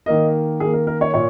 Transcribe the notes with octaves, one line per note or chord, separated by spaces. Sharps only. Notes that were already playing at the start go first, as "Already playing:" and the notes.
D#3 A#3 D#5
D#3 A#3 G#4
A#4
A#4
C#5
A#2 C#5